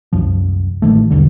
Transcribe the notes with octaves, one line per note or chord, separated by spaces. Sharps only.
C2 F#2 F3
A1 D#3 A3
B1 E2 D3 G3